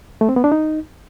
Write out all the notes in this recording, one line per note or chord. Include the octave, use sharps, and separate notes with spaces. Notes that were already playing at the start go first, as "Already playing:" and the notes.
A3
C4
B3
D4
D#4